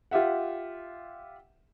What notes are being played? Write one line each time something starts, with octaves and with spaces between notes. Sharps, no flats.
F4 G4 E5 F#5